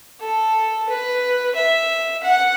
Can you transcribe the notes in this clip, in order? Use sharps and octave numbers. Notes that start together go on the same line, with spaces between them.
A4
B4
E5
F#5